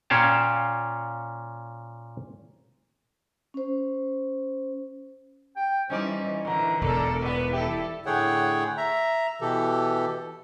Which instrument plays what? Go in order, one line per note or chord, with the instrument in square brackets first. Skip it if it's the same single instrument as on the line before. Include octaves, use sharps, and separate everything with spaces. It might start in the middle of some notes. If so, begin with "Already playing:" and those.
[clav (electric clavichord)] A#2 C#4 C#5 F5 G5 A5
[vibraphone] C#4 C5
[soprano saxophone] G5
[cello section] E3 G3 [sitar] C#4 D#4 D5 [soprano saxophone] C5
[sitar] A#2 D3 [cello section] E3 [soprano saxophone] A#5
[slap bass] E1 [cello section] A4 D5 [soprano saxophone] A#4
[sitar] A#2 B3 [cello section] B4 [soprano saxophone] D5
[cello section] E4 A4 [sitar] G4
[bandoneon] A2 D3 G#4 C#5 F#5 G5
E5 A#5
B2 E3 G4 A4